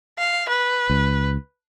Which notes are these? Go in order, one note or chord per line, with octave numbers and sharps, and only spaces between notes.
F5
B4
C#2